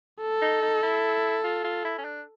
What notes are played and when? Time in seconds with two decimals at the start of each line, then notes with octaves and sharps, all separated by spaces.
0.21 A4
0.42 D#4
0.62 D#4
0.83 E4
1.44 F4
1.64 F4
1.85 E4
1.98 C#4
2.05 D4